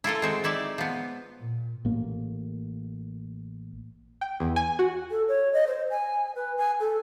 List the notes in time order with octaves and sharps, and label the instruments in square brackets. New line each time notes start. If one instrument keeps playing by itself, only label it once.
[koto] E4 F4 A4 A#4
G#3 C4 F#4
D#4 E4 D5 E5
F3 B3
[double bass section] A#2
[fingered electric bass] A1 A#3
[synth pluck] G5
E2
G#5
F#4
[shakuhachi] A4
C#5
D#5
C5
G#5
B4
G#5
A4